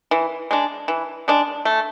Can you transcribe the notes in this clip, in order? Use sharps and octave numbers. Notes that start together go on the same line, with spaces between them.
E3
G#3 D4
E3
G#3 D4
A3